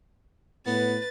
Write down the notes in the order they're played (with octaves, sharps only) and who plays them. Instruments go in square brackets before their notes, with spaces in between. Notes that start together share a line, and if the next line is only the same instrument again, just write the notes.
[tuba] A2 [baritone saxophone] B3 [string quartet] B4 A6